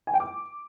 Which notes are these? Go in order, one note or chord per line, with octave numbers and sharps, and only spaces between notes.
G#5
G5
D6